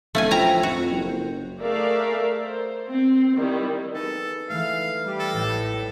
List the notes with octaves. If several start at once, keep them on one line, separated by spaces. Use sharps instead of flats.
D1 A3 C#4 E5 F5 G#5
F3 E4 B4 G5 A#5
F2 F#4
F#1
C5
A3 G#4 A#4 D5 E5 F5
C5
C4
D#3 G3 E4
B3 D#4 G#4 A4
E3 G#3 A3 F5
G3 G4
A4 E6 A#6
A1 A2 G3